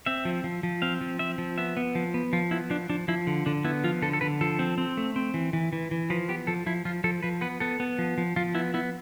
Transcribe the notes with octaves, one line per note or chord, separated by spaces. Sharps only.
C4 E5
F3
F3
F3
C4 F5
F3
C4 E5
F3
B3 E5
B3
F3
B3
F3 F4
B3 E4
F3 D4
F3 D4
F3 E4
D3
D3 D4
B3 E4
F3 F4
D3 A4
A4
D3 B4
F3 A4
C4
C4
A3
C4
E3
E3
E3
E3
F3 B4
B3 G4
F3 A4
F3 E4
F3 F4
F3 A4
F3 B4
B3 B4
B3 A4
B3
F3
F3
F3 F4
B3 E4
B3 E4